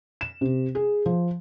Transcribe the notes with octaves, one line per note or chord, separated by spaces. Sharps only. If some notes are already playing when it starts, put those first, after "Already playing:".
E7
C3
G#4
F3